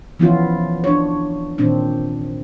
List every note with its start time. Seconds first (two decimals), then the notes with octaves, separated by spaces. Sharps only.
0.19 E3 F3 B3 C#4 E4 F4
0.84 D4 C#5
1.58 A#2 D#3 C4 D4